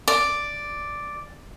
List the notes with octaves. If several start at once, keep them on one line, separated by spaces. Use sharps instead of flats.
D5